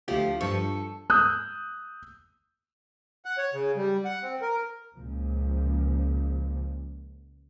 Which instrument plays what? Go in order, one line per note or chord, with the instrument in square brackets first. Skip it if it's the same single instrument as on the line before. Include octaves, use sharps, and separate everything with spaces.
[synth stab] D2 G4 [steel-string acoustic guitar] F3 A3 F4
[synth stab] G2 F3 C#6 [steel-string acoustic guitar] A4
[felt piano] D#6 E6 F#6 G6
[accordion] F#5
C#5
C#3
G3
F#5
C4
A#4
[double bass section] C#2 A#2 F3